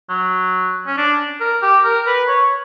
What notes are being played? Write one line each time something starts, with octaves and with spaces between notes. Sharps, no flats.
F#3
C#4
D4
A#4
G4
A#4
B4
C#5